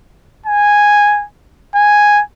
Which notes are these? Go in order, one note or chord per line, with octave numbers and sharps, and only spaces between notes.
G#5
G#5